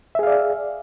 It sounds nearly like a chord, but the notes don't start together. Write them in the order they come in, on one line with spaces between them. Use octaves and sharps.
E5 G#4 F5 D5